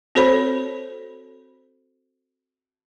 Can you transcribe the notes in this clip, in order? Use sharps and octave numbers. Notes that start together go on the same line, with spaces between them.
C4 F#4 A4 C5 C#5 B5